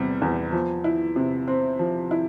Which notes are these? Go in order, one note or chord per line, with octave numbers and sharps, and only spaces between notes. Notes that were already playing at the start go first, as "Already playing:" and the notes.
Already playing: E2 C3 G3
E2
F3
E4
C3
C4
F3
E4